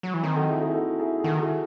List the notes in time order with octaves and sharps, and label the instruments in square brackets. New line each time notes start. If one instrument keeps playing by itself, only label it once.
[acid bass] F#3
E3
[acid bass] D#3 [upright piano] C4 D#4
[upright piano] F#4 A4
E4 G#4
E4 G#4
F#4 A4
E4 G#4
G#4
[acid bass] D#3 [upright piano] F#4 A4
[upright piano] E4 G#4